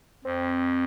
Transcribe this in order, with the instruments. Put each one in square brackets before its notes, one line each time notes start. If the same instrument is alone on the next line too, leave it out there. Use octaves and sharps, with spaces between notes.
[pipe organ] F2 [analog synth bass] C4